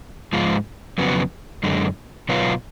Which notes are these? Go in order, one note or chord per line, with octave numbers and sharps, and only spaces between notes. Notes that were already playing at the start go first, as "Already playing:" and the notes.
G#2 F3 G#3 F4
F2 C#3 F#3 B3
F#2 D3 G#3
B2 F#3 B3 F4